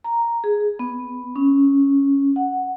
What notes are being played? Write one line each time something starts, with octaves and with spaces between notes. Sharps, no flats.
A#5
G#4
B3
C#4
F#5